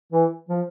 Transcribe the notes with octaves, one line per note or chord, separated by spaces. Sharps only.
E3
F3